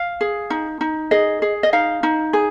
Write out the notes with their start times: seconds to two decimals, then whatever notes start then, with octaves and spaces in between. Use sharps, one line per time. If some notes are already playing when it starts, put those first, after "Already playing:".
Already playing: F5
0.21 G#4
0.50 D#4
0.81 D#4
1.11 G#4 D#5
1.42 G#4
1.63 D#5
1.73 D#4 F5
2.03 D#4
2.33 G#4